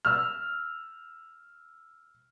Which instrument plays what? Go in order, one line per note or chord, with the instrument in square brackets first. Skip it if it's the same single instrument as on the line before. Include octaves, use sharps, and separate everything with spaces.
[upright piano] E6 F6